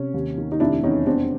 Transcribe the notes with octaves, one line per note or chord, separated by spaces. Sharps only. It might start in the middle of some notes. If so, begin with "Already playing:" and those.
Already playing: C3 C#4
D#2
D#3
D#4
F1 D4 E4
E2 C#4 D#4
E1 C4 D4